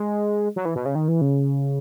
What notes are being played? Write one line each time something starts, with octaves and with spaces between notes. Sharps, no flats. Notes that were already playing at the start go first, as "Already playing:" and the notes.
Already playing: G#3
F#3
E3
B2
C#3
D#3
E3
C#3